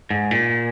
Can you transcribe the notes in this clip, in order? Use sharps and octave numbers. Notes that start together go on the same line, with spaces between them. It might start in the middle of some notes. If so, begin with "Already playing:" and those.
G#2
A#2